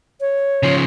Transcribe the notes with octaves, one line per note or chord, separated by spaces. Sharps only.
C#5
C#3 F3